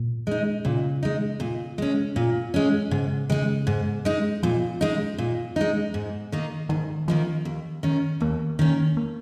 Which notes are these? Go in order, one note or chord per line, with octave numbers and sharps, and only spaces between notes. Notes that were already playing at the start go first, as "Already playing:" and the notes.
Already playing: A#2
G#3 D#4
A#2 C#3
G#3 D#4
A#2
G#3 C#4
A#2
G#3 C#4
G#2 C#3
C#3 G#3 D#4
G#2
G#3 D#4
A#2 F3
G#3 D#4
A#2
G#3 D#4
G#2
D#3 A#3 D#4
G#2 D#3
D#3 F3 A#3 D#4
D#2
D#3 C#4
D#2 A#3
D#3 C#4
A#3